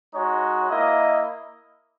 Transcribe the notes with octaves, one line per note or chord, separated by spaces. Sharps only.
G#3 D#4 F#4 C#5
A#3 E4 D#5